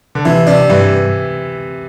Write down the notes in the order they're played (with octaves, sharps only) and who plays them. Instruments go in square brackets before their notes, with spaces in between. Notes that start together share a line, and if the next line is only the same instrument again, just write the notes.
[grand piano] D3
[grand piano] C3 [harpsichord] E3
[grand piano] C3 [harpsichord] D4
[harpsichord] G2 [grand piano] E3